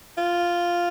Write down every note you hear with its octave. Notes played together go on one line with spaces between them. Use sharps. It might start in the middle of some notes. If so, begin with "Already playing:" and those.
F4